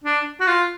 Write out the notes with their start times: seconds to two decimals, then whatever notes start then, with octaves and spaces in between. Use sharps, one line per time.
0.04 D4
0.40 F#4
0.47 F4